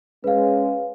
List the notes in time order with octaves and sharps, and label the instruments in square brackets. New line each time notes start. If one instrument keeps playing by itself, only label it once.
[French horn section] G#3 C#4 [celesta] B4 F5